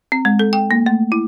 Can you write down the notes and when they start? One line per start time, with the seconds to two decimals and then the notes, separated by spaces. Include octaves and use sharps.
0.12 C4
0.25 G#3
0.39 A4
0.53 G5
0.71 A#3
0.86 A3
1.12 E4